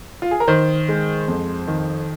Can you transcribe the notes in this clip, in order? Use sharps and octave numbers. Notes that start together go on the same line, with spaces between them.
F4
G#4
A#4
D#3 C5
G#3
F2
D#3